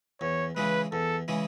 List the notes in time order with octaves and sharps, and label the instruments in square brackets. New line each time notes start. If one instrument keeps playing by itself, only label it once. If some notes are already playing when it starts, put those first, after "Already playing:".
[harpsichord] E2 [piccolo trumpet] C#5
[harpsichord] C#3 E3 G#3 [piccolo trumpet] B4
[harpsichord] E2 [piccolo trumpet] A4
[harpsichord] C#3 E3 G#3